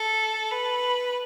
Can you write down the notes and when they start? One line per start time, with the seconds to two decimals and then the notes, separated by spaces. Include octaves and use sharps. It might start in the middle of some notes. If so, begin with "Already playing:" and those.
Already playing: A4
0.51 B4